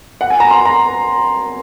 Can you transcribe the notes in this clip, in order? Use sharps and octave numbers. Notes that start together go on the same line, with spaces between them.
F#5
G#5
A#5
C6
A#5